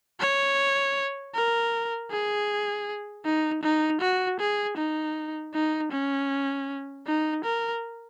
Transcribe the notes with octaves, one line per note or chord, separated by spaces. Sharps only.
C#5
A#4
G#4
D#4
D#4
F#4
G#4
D#4
D#4
C#4
D#4
A#4